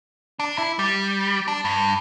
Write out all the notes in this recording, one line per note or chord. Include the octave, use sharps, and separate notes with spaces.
D4
E4
G3
D4
G2